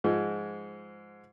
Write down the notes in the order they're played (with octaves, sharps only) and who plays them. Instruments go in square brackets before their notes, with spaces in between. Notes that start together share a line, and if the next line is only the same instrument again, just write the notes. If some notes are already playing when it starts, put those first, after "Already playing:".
[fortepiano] G#2 F3 G#3